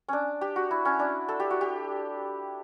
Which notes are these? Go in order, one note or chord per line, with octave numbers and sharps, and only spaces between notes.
C#4 D4
G4
F#4
E4
C#4
D4
A4
G4
F#4
G4